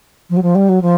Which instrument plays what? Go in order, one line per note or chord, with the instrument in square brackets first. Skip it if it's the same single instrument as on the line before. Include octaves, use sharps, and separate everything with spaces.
[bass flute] F3
F#3
F3
G3
F#3
F3